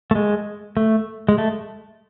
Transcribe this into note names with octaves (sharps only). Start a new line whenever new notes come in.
A3
G#3
A3
G#3
A3